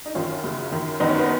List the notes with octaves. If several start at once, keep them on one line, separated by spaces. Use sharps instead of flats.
D#4
F#2 D#3 C#4 F4
F#2 C#3
F#2 D#3
F#2 D#3 B3 D#4
C#4
B3